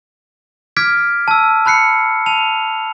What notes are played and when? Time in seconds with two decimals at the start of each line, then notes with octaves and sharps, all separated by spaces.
0.77 D6 F6 G#6 B6 D7
1.28 A5 E6
1.65 A5 B5 F#6 C7 C#7
2.26 A5 F7